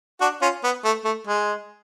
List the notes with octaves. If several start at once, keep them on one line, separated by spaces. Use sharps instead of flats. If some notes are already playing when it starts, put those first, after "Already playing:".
D4 F#4
C#4 F4
B3
A3
A3
G#3